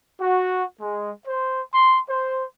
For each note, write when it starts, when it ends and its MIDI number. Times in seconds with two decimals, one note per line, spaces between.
0.19 0.63 66
0.81 1.11 56
1.27 1.62 72
1.74 1.98 84
2.09 2.45 72